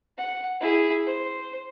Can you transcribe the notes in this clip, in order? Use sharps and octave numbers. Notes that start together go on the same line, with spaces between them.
F#5
E4 G#4
C5